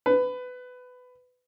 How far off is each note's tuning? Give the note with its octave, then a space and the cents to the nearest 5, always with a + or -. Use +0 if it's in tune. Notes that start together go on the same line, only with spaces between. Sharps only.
B4 +20